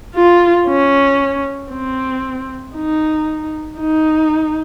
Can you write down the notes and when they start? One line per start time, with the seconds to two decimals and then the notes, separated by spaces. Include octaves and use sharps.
0.15 F4
0.67 C#4
1.71 C4
2.75 D#4
3.79 D#4